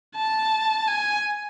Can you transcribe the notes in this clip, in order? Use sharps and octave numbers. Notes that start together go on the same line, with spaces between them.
A5
G#5